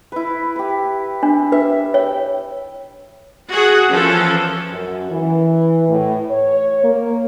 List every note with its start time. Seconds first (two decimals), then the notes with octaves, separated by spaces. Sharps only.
0.12 E4 B4
0.56 G4 B4
1.23 D4
1.52 B4 E5
1.94 C#5 G5
3.49 F#4 G#4 F#5
3.90 E3 F3 C#4 A4
4.71 F#2
5.11 E3
5.89 A2
6.30 C#5
6.84 A#3